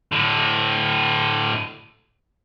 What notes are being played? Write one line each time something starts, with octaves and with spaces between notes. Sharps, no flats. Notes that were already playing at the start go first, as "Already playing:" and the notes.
A2 D3